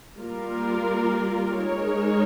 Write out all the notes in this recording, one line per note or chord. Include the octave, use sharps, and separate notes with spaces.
G3 A#3 F4 A#4
G#3 D#4 A#4 C#5